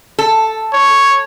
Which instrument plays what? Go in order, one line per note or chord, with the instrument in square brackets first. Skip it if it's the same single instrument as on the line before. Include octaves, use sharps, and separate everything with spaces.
[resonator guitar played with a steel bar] A4
[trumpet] C#5